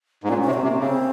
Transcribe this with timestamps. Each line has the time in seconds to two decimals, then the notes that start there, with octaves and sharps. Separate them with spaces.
0.24 G#2
0.28 A#2 C#4
0.41 C#4
0.46 C3
0.53 C4
0.63 C3
0.67 A#3
0.80 C#3 C4